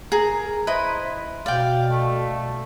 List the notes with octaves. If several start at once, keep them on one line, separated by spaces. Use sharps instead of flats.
G#4 A#4 A#5
E4 B4 C5 D#5
B2 D5 F5 G5
A3